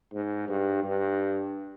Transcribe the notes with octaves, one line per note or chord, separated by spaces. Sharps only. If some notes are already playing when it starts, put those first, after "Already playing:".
G#2
G2
G2